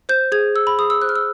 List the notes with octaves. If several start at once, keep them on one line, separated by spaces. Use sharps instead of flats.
C5 G6
G#4 G#6
G#4 E6
B5
G#4 D#6
E6
C5 F#6
F6
E6